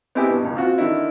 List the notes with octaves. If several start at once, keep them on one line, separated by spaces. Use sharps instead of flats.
B3 C4 E4 G4 G#4
G2 B2
D#1 C#2
C4 F4 F#4
D3 D#3 E4